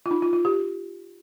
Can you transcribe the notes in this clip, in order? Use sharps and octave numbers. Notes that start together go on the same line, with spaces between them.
F4
D#4
F4
F4
G4